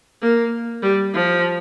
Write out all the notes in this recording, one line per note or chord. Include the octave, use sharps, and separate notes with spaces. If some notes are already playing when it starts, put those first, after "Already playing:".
A#3
G3
F3